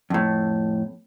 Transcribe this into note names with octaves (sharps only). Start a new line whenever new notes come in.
F2 A2